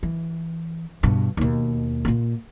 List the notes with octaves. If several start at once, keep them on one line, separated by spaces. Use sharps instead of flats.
E3
G2 B2
D#2 B2
A#2 A#3